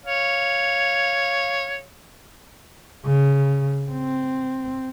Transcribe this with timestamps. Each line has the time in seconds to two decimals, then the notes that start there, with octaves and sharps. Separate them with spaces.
0.06 C#5 F5
3.06 C#3
3.91 C4